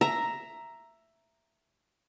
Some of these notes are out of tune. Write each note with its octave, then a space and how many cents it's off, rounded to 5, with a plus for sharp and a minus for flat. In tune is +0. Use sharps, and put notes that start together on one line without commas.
E5 +10 A#5 +0